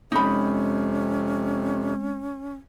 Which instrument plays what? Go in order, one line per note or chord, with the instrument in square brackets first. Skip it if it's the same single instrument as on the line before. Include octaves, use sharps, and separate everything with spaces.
[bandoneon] F2 C3 [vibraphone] G#3 C4 [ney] C#4 [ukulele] D#4 B5